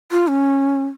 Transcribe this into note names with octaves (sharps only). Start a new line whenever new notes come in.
F4
C#4